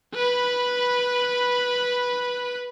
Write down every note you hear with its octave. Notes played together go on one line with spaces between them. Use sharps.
B4 B5